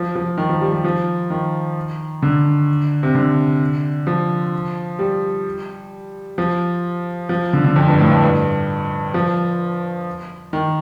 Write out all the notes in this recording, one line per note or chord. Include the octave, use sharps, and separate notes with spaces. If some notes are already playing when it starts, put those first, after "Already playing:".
Already playing: F3
F3
D#3
F3
G3
G3
F3
D#3
D3
C3
D3
F3
G3
F3
F3
D3
D3
F2
G2
A2
G2
G2
F3
D#3